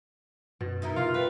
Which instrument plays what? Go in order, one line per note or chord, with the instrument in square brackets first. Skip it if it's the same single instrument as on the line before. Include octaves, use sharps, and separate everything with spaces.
[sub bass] F#2 [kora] B2
[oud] D#4 E4 A#4
[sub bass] C3 [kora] F4 [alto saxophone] F5
[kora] G3 [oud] F4 [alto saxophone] B4